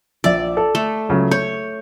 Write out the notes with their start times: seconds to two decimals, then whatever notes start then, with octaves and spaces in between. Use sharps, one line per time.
0.24 A#1 D5 E5 E6
0.57 A4
0.75 A3
1.09 C#2 C#3 F#3
1.31 C#5 G6